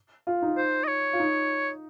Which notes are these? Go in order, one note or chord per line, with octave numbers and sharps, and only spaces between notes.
F4
D#4
C5
D#5
C#5
F4
D#4